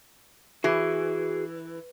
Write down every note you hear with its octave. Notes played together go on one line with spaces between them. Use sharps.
E3 F#4 G#4